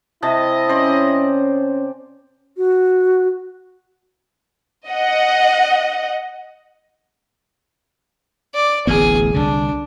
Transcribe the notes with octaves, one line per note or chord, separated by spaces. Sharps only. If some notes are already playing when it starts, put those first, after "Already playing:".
C3 E4 D#5 A5
C#4 C5 D5
F#4
D#5 F#5
D5
D1 A1 B3 G#4
C2 D3 D4